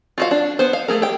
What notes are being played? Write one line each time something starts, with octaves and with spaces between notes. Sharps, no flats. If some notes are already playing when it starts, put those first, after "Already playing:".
F4 F#4 F5
D4
B3 C5
F5
A3 G#4 A#4
G4 G5